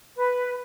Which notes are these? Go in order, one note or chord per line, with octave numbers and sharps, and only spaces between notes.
B4